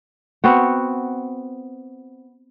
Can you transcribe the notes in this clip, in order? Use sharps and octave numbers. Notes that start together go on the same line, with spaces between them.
B3 C4 F#4